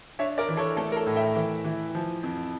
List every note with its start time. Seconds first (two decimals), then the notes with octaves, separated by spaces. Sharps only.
0.19 D4 C#5 E5
0.38 A#4 D5
0.48 E3
0.57 A4 C#5
0.77 A3 A4 C#5
0.92 A#4
0.97 A4
1.07 A2
1.16 E5 G5
1.36 E3
1.64 E3
1.95 F3
2.23 F2